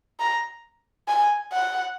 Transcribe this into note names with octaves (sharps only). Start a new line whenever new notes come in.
A#5
G#5
F#5